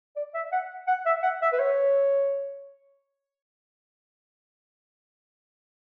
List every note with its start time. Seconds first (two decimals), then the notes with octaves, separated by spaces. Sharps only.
0.16 D5
0.34 E5
0.52 F#5
0.88 F#5
1.06 E5
1.23 F#5
1.42 E5
1.53 B4
1.59 C#5